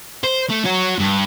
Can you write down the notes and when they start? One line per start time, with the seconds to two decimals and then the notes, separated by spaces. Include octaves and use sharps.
0.24 C5
0.49 A3
0.65 F#4 C#5
0.98 G2